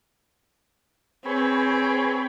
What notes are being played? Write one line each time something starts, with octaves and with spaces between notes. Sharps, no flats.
C4 G#4 B4 C#5